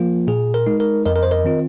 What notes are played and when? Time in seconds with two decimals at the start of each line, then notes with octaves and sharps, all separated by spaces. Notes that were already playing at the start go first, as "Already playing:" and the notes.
Already playing: F3 A#3 F4
0.27 A#2 G#4
0.54 A#4
0.66 G#3 D#4
0.80 A#4
1.06 F2 A#4 D#5
1.16 A#4
1.23 C5
1.31 A#4 D#5
1.44 D#3 C4 F4